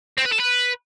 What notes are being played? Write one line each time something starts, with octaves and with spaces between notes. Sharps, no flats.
C4
B4
A4
B4